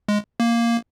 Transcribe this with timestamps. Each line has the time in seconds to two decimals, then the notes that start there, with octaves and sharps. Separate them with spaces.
0.08 G#3
0.40 A#3